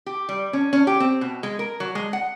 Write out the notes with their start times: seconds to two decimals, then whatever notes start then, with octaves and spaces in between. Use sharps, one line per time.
0.06 G4
0.29 G3
0.53 C#4
0.73 C#4
0.87 G4
1.00 C4
1.21 B2
1.43 G#3
1.59 A#4
1.80 F#3
1.95 G#3
2.13 F#5